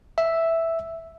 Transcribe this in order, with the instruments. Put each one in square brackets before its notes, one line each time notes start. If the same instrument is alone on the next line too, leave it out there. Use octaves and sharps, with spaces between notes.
[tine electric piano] E5